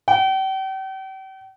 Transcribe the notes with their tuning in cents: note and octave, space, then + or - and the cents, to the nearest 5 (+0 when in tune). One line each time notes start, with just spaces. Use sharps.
G5 -40